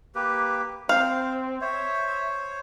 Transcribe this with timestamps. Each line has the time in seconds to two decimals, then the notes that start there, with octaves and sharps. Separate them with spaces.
0.15 A#3 G4 B4
0.89 C4 C5 F5
1.61 C5 C#5 E5